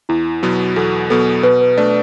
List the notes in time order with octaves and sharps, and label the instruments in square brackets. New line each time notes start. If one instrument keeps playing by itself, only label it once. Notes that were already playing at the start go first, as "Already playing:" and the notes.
[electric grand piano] E2 [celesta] E4
[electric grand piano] B2 F#3 B3 [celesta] F#4
[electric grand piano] E2 [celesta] A4
[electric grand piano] B2 F#3 B3 [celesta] A4
[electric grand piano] B2 [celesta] B4
[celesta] B4
[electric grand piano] A3 D4 [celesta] D5